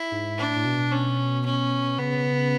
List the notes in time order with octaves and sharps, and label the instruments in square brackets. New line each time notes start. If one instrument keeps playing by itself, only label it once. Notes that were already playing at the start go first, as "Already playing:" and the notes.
Already playing: [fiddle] E4
[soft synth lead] G#2
[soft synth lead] A2 [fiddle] D4
[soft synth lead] A2
B2
[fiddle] C#4
C#4
[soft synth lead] C#3 [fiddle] B3